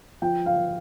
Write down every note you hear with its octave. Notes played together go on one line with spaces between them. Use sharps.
F3 G5
F5